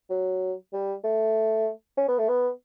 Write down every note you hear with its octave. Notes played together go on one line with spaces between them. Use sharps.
F#3
G3
A3
C#4
B3
A3
B3